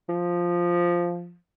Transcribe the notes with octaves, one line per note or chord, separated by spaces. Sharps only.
F3